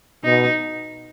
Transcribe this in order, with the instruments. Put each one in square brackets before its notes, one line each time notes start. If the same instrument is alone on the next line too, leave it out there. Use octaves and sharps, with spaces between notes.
[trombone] B2 [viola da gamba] D#4